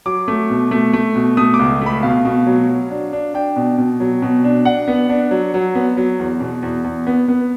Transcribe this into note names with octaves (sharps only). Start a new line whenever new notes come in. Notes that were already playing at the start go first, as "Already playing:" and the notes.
F#3 D6
A3
B2
A3
A3
B2
A3 D#6
D6
C#2
A3 B5
B2 F5
B2
F#3
F#3
D4
D4
D4 G5
B2
B2
F#3
B2
D4
D4 F#5
B3
D4
F#3
F#3
B3
F#3
E2
B2
E2
E2
B3
B3